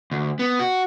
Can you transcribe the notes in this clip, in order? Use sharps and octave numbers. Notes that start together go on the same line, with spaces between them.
D2
B3
F#4